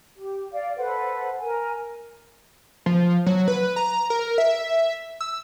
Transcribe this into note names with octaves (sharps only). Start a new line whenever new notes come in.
G4
D5 F5
A4 B4 C5 F#5
A#4 G#5
F3
F#3
B4
A#5
A#4
E5
E6